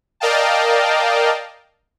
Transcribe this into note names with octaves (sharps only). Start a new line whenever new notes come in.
A#4 D5 D#5 F5 G5 A5